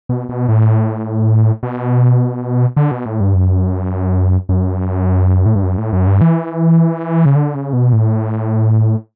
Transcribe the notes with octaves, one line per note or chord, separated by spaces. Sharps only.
B2
B2
A2
B2
D3
B2
A2
G2
F#2
F#2
A2
G2
F#2
A2
F#2
G2
E3
C#3
D3
C#3
B2
A2